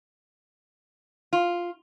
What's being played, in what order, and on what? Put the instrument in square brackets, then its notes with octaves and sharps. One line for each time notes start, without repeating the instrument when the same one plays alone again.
[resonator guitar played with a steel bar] F4